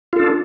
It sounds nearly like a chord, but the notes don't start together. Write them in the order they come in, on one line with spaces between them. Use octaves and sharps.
F4 A4 D4